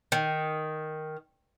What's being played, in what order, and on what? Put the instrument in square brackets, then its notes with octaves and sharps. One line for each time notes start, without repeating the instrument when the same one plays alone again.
[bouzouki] D#3